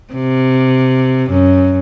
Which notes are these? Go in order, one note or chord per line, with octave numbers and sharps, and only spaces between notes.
C3
F#2